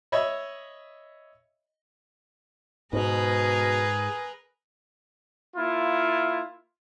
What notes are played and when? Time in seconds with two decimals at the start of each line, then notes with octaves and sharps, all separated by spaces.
0.12 C#5 D#5 E5 B5
2.93 G#2 B2 G#4 A#4 B4
5.56 A#3 E4 F4